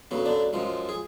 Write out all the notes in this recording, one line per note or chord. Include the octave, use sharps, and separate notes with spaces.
D2 C#3 F#3 B3
D3 D4
F#2 F3 G#3
G#4